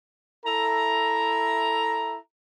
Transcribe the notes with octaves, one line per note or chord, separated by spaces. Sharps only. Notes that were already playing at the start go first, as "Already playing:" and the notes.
E4 A4 E5 A#5